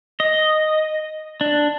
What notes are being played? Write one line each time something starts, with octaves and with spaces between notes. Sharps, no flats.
D#5
D4